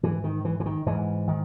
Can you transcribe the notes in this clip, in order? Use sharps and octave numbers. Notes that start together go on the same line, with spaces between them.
G#2 E3
D#3
E3
E3
D#3
G#2 E3
D#3